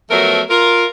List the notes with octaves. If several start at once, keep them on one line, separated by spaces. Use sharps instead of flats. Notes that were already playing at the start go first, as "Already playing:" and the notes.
F3 F#3 A3 B3 A#4
F4 A#4